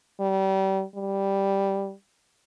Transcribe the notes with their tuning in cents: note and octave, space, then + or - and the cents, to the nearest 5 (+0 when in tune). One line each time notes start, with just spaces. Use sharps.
G3 -30
G3 +0